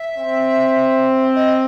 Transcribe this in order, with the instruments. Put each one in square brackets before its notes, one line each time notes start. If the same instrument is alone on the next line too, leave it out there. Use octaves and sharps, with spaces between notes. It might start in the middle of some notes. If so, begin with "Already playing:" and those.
Already playing: [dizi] E5
[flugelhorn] C4
[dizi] D#5